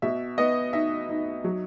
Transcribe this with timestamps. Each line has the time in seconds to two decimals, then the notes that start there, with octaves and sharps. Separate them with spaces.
0.02 B2 E5
0.38 B3 D#5
0.73 D#4 E5
1.09 D#4
1.44 F#3